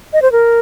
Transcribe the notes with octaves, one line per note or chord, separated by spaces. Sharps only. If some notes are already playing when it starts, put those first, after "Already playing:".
D#5
C5
A#4